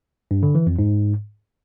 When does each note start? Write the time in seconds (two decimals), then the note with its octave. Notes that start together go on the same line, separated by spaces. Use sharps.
0.31 G2
0.43 D3
0.55 E3
0.67 F2
0.79 G#2